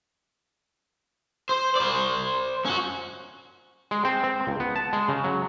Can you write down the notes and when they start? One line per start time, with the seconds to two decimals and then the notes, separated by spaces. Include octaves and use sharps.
1.49 C5
1.76 C5 D5
2.65 C#4 F#4
3.91 G#3
4.05 C4
4.24 C4
4.47 C#2
4.60 B3
4.76 A5
4.93 G#3
5.08 C#3
5.24 F#3